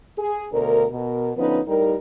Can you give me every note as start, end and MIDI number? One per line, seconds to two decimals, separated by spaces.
0.17 0.46 68
0.52 0.85 38
0.52 0.85 47
0.52 0.85 70
0.91 1.29 47
0.91 1.29 70
1.37 1.59 50
1.37 1.59 53
1.37 1.59 59
1.37 1.59 61
1.37 1.59 63
1.37 1.59 71
1.66 1.95 45
1.66 1.95 55
1.66 1.95 63
1.66 1.95 67
1.66 1.95 70